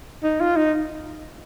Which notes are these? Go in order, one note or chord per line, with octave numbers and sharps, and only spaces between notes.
D#4
F4
D#4